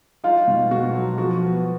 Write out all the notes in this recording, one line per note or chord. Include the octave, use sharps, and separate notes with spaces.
D#4 F4
B2
B2 F#4
F#3
F3 F#4
B3